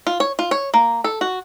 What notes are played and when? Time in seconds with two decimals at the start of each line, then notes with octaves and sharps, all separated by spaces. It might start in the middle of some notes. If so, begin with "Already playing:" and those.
0.07 F4
0.20 C#5
0.39 F4
0.51 C#5
0.74 A#3
1.04 A4
1.21 F#4